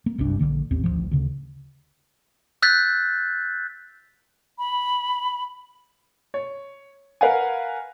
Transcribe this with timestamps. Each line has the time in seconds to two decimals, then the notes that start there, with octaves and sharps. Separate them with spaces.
0.06 A#3
0.18 F#1 C2 G2 D4
0.39 A#1 F#2 D3 A#3
0.71 A1 D#2 C4
0.84 D1 A1 F2 F3
1.11 D2 C#3
2.62 E6 F#6 G6 A6 B6
4.58 B5
6.34 C#5
7.21 A#4 B4 F5 F#5 G#5